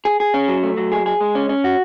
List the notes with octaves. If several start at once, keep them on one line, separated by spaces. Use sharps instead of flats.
G#4
G#4
C#4
F#3
A3
F#3
G#4
G#4
G#3
C#4
C#4
F#4